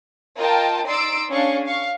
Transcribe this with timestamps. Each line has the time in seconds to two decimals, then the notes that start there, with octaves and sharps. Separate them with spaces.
0.38 F4 A#4 D#5 G5 A5
0.87 D#4 D5 C6 E6 D7
1.32 C#4 D4 G#4 F5 C#6
1.65 F5 C#6